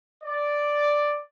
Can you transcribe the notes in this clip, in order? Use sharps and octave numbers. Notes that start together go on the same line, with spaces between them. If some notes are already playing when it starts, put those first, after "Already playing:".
D5